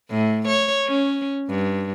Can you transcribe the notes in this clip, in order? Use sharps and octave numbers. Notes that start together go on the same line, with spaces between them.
A2
C#5
C#4
G2